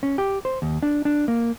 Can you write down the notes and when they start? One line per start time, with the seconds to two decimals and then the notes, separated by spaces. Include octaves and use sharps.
0.03 C#4
0.18 G4
0.45 C5
0.62 D#2
0.83 D4
1.05 D4
1.28 A#3